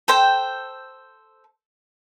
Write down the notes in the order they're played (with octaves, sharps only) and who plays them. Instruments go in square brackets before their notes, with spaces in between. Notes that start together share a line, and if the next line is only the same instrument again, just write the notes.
[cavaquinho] A4 C5 G5